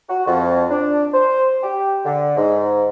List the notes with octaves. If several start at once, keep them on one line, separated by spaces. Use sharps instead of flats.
F#4
F2
D4
C5
G4
D3
G#2